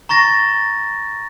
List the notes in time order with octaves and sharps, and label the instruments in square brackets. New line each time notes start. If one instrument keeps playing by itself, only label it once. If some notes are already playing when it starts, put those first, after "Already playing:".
[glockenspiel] A#5 C#6 A6 A#6